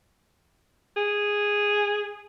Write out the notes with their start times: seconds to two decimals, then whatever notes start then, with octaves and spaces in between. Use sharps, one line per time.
0.97 G#4